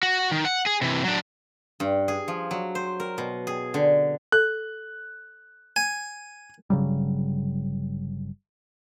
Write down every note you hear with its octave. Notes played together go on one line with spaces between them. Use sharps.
F#4
D#3
F#5
G#4
C3 E3
F#3 D4
G2
G#4
F3
F#3
C5
A#4
B2
G#4
D3
A4 F#6
G#5
G1 C#3 F#3 G3